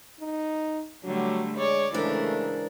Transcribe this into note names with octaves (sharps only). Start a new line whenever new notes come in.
D#4
D3 F#3 G3 A3
G#3 C#5 D5
G#2 C#3 E3 A3 D4 A#4